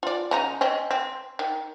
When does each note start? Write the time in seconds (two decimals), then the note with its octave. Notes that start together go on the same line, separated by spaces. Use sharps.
0.03 F4 D5
0.31 C#3 D#4 A#5
0.61 C4 C#4 D#5
0.91 C4
1.39 D#3